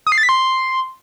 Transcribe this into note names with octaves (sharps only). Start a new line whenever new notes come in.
D#6
C7
A6
B6
C6